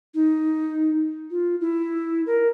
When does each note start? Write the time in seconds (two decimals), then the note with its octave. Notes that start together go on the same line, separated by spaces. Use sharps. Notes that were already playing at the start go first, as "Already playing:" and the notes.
0.14 D#4
1.30 F4
1.60 E4
2.26 A#4